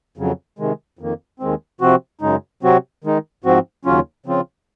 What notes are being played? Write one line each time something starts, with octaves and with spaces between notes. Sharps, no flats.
F2 C#3 F#3
C3 D#3 G#3
F2 D#3 A#3
D#2 D#3 G#3 C4
C3 F3 C4 F#4
F#2 C#3 G#3 D#4
C3 F#3 C4 F#4
D#3 G#3 D#4
G#2 F3 C4 F#4
D#2 C#3 F#3 C#4 F4
C#3 F3 C4 F4